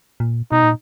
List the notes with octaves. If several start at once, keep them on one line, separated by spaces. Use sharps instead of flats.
A#2
B2 D#4
A#2